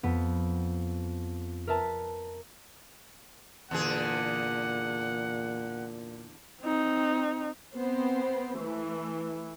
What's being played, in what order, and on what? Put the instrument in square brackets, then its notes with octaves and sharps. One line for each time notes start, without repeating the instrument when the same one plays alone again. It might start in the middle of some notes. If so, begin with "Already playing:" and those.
[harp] F2 B3
A#4 B4 E5 A5 A#5
[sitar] E2 D3 G#4 [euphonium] A#2 [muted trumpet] F#5
[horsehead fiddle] C4 D#4
[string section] B3 C4 C5
E3 A3